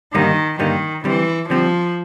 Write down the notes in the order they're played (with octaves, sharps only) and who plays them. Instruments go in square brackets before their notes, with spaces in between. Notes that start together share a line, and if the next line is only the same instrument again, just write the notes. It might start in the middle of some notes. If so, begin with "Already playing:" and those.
[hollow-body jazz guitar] G2 D3 G3 A#3 D#4 [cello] D#3
[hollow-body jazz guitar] G2 D3 G3 A#3 D#4 [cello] D#3
[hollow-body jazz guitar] D3 G3 C4 [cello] E3
[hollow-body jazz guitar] D3 G3 C4 [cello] F3